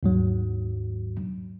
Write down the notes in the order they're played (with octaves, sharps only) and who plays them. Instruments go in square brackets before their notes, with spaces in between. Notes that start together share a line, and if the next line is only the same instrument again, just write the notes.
[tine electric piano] D#2 G#2 F#3